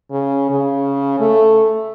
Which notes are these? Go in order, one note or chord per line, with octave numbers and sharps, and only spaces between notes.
C#3
C#3
A3